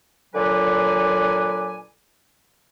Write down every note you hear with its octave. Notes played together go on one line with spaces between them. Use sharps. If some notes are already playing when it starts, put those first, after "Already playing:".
A#2 D3 F#3 B4 D5 G#5